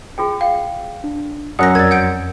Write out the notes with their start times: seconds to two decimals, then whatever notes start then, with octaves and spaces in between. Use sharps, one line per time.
0.18 F4 G#4 G5
0.41 F5 G5
1.04 D4
1.59 F#2 F#5 D#6 F#6 A#6
1.75 F2 A#4 D5 G#6 A6
1.91 F#5 G6 D7